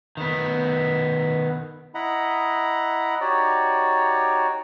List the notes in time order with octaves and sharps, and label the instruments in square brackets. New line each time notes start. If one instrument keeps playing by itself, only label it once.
[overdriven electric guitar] D#3 B3
[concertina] E4 D#5 F#5 A#5 B5
D#4 F#4 G4 C#5 D5